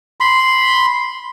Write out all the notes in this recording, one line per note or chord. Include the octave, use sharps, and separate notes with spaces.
B5 C6